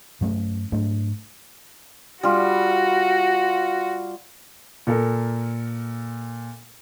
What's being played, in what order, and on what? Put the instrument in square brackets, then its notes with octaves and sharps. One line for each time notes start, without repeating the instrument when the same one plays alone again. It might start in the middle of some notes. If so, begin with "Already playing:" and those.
[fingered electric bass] G2 F#3 A3 C#4
G#2 F#3 A3 D4
[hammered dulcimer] G3 F4 [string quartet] F#4
[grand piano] A#2 A4 A#4